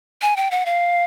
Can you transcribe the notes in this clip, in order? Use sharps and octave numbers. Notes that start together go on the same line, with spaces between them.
G#5
G5
F#5
F5